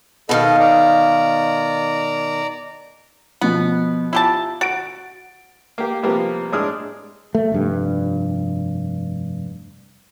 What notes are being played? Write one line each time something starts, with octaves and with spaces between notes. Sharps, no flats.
B2 D#3 A4 D#5 F5
D5 A#5
B2 F3 B3
E4 F4 G4 A5
F#4 A6 D7
A#3 G4
C3 F3 G3 A#3 B3
A2 G#3 D4 G#4 D#6 F6
A3
F1 G2